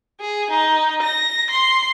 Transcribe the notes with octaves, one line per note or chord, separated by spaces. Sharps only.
G#4
D#4
A#6
C6